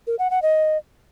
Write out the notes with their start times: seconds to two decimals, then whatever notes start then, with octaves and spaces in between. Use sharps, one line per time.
0.07 A#4
0.19 F#5
0.31 F#5
0.42 D#5